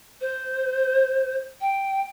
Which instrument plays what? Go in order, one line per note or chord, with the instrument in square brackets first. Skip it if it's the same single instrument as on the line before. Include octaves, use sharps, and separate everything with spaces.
[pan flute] C5
G5